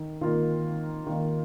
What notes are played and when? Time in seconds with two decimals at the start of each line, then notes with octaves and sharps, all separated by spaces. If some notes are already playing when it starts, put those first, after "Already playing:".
Already playing: D#3 D#4
0.21 D#3 A#3 D#4 F4
1.07 D#3 A#3 D#4